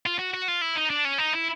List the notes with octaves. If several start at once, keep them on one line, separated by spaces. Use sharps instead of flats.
F4
F#4
F#4
F4
E4
D#4
D4
C#4
D#4
E4